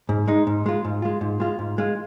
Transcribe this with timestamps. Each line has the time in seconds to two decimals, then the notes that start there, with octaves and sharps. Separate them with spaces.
0.09 G#2
0.27 G#3 D#4
0.47 G#2
0.66 G#3 F4
0.85 G#2
1.02 G#3 F4
1.21 G#2
1.40 G#3 F4
1.59 G#2
1.78 G#3 F4